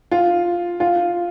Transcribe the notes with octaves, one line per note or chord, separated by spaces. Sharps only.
F4
F4